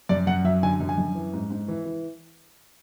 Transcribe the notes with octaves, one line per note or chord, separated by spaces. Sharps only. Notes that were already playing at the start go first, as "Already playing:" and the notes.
F#2 D5
F#2 F#5
F#3 E5
D3 G#5
F#2
G#5
F#2
E3
G#2
G#2
E3
E3